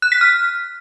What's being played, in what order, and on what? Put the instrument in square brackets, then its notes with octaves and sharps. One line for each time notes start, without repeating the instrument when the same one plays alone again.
[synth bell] F#6
B6
F6